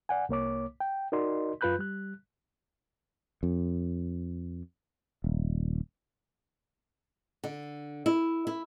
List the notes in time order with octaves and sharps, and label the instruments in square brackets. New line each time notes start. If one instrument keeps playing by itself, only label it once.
[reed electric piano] D5 F#5 G#5
C2 A#3 C#5 D6
G5
D#4 F#4 A#4 D5 D#5 C6
F#2 F4 B4 B5 F#6 G6
G3 F#6
[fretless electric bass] F2
D#1
[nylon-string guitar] D3
E4
E4